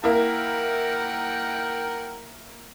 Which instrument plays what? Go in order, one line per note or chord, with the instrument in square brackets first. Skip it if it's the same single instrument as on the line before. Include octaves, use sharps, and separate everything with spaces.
[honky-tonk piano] A#3 E4 [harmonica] A#4 F#5 G5